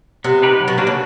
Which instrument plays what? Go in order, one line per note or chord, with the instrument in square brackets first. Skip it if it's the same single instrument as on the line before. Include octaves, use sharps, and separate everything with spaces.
[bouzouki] C3 [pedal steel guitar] B3
[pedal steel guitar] D#4 G4 B4
F#3
[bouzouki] B2
[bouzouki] C3 [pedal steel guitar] A#3 D4 F#4 B4
[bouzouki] C#3